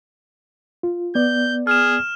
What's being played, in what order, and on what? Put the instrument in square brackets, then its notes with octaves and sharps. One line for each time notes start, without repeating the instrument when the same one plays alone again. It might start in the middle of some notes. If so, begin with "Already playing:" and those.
[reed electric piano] F4
[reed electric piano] B3 D5 [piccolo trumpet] G6
[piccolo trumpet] G#4 [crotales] F6 E7